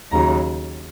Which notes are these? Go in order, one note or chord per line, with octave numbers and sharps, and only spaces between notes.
D#2 C#3 F#3 A#5